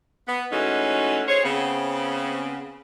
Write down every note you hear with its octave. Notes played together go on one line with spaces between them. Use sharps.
B3
E3 G#3 A3 C#4 D#4 F#4
G#4 C5 C#5
C#3 B3 C4